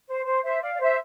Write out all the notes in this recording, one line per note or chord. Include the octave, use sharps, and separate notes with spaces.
C5
C5
C5 E5
D5 F5
D5
C5 E5